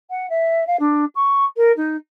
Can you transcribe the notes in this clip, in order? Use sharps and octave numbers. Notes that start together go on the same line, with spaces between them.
F#5
E5
F5
D4
C#6
A#4
D#4